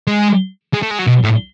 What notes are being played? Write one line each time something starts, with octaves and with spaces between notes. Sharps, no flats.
G#3
G#3
A3
G#3
F#3
B2
A2